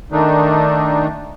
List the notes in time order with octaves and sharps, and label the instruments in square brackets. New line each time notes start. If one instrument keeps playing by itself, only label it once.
[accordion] D#3 A3 D4 D#4